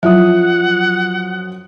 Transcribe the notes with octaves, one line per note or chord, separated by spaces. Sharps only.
F#2 F3 F#3 F#5 D#6